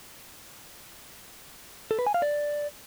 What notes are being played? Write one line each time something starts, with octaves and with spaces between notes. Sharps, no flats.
A4
B4
G#5
F5
D5